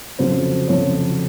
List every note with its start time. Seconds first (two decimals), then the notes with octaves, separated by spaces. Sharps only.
0.19 F2 C#3 F#3 C5
0.67 F2 C#3 F#3 C#5